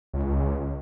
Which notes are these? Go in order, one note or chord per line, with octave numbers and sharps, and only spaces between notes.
C#2